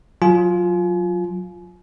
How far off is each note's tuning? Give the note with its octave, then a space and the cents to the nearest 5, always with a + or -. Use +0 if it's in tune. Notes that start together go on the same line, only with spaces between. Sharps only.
F#3 -20 F4 +5 G#5 +35